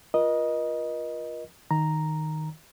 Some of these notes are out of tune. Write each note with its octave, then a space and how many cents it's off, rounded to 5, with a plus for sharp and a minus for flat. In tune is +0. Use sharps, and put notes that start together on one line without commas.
F4 +0 A#4 +45 D#5 +0
D#3 +0 A#5 +0